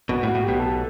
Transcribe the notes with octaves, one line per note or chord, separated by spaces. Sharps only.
B1 B2 F#4
A2
F#4
A2
B1 B2 G4
A4